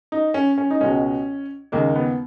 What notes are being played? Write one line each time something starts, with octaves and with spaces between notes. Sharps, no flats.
D#4
C#4
C#4
D#4
C#2 B2 G#3 C#4
D#2 C#3 G#3 A#3
B3